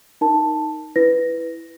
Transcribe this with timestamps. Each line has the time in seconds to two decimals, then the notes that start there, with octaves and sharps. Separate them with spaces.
0.21 D#4 A#4 A5
0.96 E4 B4 A#6